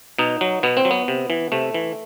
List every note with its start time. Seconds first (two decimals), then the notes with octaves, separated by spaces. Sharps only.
0.19 B2 D#4
0.41 F#3
0.63 B2 B3
0.77 C4
0.85 F#3
0.91 B3
1.08 C3
1.30 E3
1.52 C3 A3
1.74 E3